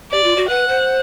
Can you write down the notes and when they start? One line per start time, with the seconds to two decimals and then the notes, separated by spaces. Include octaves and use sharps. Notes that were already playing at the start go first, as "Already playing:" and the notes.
0.11 G4 D5
0.24 F4
0.36 F#4
0.49 B4 F#5
0.68 C5